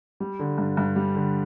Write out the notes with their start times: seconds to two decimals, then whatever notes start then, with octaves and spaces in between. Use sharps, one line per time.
0.20 G3
0.39 D3
0.58 G2
0.77 G2
0.96 G3
1.15 D3